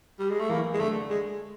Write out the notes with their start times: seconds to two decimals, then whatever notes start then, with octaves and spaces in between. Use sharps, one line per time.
0.19 G3
0.30 G#3
0.40 A3
0.49 E3 A#3
0.74 G#3
0.80 D3 A3
1.10 G#3